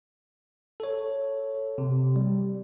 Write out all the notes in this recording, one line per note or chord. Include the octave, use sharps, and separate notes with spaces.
A4 C#5
C3
G3